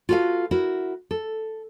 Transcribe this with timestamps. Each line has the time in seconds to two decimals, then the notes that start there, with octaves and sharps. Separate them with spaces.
0.09 F4 F#4 A4 B4 F5
0.51 E4 F#4 A#4
1.11 A4